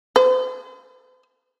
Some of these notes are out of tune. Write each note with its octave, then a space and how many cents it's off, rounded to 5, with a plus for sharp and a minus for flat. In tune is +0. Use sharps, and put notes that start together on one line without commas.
C5 -40